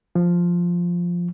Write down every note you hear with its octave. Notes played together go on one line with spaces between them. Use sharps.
F3